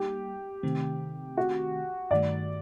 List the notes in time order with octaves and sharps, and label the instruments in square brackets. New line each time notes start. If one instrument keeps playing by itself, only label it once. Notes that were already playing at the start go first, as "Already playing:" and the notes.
Already playing: [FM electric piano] G3 A#3 D#4 [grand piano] G4
[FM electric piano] C3 D#3 A3 C4
[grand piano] F#4
[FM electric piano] G2 D#3 A3 [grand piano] D5